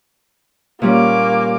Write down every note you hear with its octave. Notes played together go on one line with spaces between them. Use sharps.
A#2 G3 A#3 C#4 D6